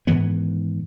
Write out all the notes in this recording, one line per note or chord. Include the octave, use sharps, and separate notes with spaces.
G#2 D#3 E3 B3